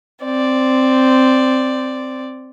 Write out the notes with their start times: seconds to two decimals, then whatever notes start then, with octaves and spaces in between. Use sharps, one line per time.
0.24 C4 D5